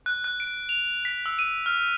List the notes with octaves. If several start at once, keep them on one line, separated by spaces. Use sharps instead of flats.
F#6
F#6
D7
F7
B6
E6
D#7
F6